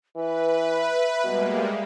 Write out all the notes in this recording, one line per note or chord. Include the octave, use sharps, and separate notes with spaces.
E3 B4 E5
B2 G3 G#3 A#3